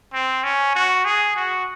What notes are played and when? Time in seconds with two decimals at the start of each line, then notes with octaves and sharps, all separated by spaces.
0.14 C4
0.44 C#4
0.76 F#4
1.05 G#4
1.36 F#4